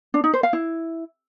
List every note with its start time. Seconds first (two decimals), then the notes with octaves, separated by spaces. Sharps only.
0.14 D4
0.24 D#4
0.33 C5
0.43 F5
0.53 E4